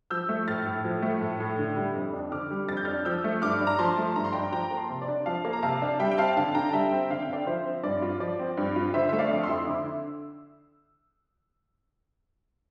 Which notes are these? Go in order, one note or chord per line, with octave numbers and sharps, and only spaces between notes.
F3 E6 G6
A3
A2 F6 A6
A2
F3
A3
A2
A2
D3
G3
F2
D4
D3 D6 F6
G3
F2 A6
G6
D4 F6 A6
F3 E6 G6
A3
G2 D6 F6
D4
A#5
F3 A5 C6
A3
G2 A#5
C6
D4 G5 A#5
F3 G5 A#5
A#3
A5 C6
C3
D5
D4
F3 F5 A5
A#3
A#5
C3 F5 A5
D4
G3 E5 G5
G5
C4 F5 A5
D3 F5 A5
D3 G5 A#5
A5
G3 E5 G5
C4
D3 F5
G5
D3 D5 F5
F3 C5 E5
C4
G2 D5
F4
F3 D5
C4
G2
F4
D3 C5 E5
A3 E5
D5 F5
F2
C6 E6
E4
D3 D6